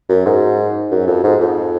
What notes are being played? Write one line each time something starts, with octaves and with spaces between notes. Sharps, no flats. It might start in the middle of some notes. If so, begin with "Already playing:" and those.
F#2
G#2
F#2
F2
G#2
F2